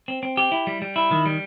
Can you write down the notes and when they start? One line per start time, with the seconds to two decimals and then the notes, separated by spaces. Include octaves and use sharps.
0.08 C4
0.23 C4
0.37 G4
0.52 E4
0.67 G3
0.82 G3
0.96 E4
1.11 D#3
1.26 G3